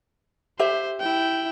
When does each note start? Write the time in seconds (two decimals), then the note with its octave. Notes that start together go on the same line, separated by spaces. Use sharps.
0.59 G4 C5 E5
1.01 E4 G5